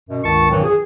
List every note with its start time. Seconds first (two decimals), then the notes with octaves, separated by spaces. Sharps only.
0.09 F#2 B2
0.24 C#2 G2 D#3 A5 C#6
0.50 G2 A#2 D#3 E3 F#3 C4
0.64 G#4